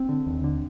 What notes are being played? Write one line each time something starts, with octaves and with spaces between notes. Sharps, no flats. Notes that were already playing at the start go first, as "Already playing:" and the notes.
Already playing: C4
D3
D#2
D3